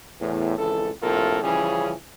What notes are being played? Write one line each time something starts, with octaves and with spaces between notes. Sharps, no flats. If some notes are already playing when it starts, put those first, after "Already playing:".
E2 A2
G#1 C#2 E3 A4
A#1 A2 C3 F4 A4 A#4
C#3 E3 F3 G3 C#4 G#4